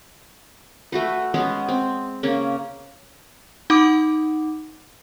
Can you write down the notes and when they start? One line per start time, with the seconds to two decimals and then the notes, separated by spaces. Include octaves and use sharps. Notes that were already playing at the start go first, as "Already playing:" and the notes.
0.92 A3 F#4 B4
1.34 G#3 B3 C#4 G#4
1.69 C4
2.23 C#3 A#3 C#4
3.70 D#4 F#5 D6 D#6